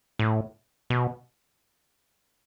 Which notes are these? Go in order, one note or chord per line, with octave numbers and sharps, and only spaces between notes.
A2
B2